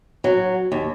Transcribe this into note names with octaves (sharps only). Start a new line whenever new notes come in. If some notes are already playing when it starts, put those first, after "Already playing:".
F#3
D#2